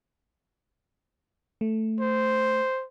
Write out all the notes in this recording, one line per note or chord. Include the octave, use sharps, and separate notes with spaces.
A3
C5